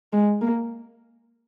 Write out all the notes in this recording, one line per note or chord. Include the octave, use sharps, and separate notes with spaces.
G#3
A#3